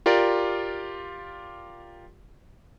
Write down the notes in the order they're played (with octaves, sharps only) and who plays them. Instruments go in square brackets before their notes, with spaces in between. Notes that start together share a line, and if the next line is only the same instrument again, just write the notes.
[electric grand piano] F4 G4 A#4 D5